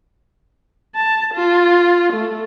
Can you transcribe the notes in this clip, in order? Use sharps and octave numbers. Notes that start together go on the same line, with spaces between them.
A5
F4
A3